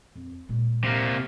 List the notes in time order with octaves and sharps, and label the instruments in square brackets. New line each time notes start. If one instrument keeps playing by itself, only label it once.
[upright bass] F2
A#2 G#3
[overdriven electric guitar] C3 A#3